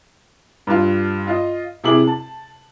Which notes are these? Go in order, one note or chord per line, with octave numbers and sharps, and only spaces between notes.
G2 F4
F4 D#5
C3 E4 G#4 D6 F#7
A5